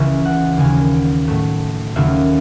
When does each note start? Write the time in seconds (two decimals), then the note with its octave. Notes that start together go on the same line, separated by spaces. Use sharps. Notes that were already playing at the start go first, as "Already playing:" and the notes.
Already playing: C#2 C#3 E3 C#5 E5
0.25 F#5
0.57 D#2 C#3 F#3 G#5
1.28 A2 F#3 A3
1.96 D#2 C#3 F#3 A3 E5